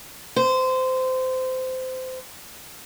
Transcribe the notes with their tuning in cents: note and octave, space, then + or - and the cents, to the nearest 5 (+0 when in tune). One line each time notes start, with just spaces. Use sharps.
C5 -20